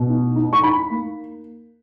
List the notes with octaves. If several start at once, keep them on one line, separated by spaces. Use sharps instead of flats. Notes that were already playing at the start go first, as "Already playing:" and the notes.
Already playing: B2
D#4
D#4
C#6
D#4 B5
A#3